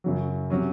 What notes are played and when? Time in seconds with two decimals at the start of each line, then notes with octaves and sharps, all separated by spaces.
0.04 F#2 C#3 F#3
0.50 C3 F#3 C#4